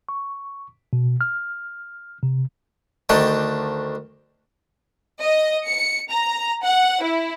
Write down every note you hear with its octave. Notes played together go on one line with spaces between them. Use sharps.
C#6
B2
F6
C3
D2 D#3 D4 G5 A5 D6
D#5
C#7
A#5
F#5
E4